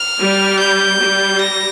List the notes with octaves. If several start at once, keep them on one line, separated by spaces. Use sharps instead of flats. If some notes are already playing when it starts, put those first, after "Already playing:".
Already playing: F6
G3
G6
G3
A#6